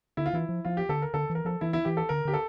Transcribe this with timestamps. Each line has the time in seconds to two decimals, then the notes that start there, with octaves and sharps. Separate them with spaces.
0.17 D3 E4
0.26 F4
0.33 E3 E4
0.49 F3
0.65 F3 F4
0.77 G4
0.89 D3 A4
1.02 A#4
1.14 D3 A4
1.30 E3
1.35 A#4
1.45 F3 A4
1.61 E3 E4
1.73 E4
1.85 E3 G4
1.97 A4
2.09 D3 A#4
2.25 D3 G4
2.33 A4